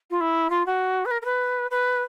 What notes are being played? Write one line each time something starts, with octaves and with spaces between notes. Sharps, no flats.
F4
E4
F4
F#4
B4
A#4
A#4
B4
B4